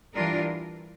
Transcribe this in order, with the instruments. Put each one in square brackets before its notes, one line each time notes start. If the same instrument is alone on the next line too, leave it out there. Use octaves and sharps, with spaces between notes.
[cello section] E3 G3 D4 F4 A#4